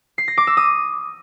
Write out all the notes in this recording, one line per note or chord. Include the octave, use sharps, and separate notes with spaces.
C7
A#6
D6
E6
D#6